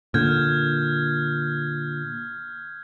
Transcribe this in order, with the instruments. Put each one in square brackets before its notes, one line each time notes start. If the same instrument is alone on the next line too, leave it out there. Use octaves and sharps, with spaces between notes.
[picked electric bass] A#2 D3 [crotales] F6 G6 G#6